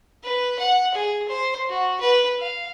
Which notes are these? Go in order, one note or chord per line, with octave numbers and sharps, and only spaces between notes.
B4
F#5
G#4
C5
F#4
B4
F5